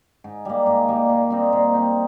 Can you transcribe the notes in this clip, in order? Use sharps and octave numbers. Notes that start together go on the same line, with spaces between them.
G#2
G3 A#3
G#2
G3 A#3
A#2
G3 C4 D#4
A#2
G3 C4 D#4